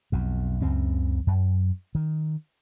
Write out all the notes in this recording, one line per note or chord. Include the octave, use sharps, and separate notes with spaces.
B1 F2
C#2 F#2 C#3 C4
F#2
D#3